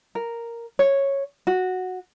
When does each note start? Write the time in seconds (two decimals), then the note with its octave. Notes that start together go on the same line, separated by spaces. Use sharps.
0.15 A#4
0.79 C#5
1.47 F#4